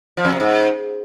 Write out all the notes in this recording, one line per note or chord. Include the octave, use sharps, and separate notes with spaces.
F3
F2
C3
G#2